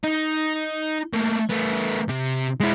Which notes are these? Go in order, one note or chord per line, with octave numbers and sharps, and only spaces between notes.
D#4
A3 A#3
A3 B3
C3
G#3 E4